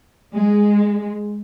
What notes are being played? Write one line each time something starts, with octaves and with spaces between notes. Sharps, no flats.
G#3